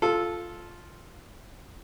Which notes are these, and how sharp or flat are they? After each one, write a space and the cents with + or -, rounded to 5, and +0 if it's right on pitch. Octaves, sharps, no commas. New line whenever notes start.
F4 +0 A4 -10